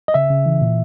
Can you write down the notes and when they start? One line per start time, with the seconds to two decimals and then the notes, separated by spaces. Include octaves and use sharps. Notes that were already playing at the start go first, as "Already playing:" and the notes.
0.08 D#5
0.14 C#3 E5
0.30 C#3
0.46 E3
0.62 A#2